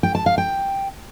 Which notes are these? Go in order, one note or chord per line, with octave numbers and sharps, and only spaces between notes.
G5
A5
F5
G5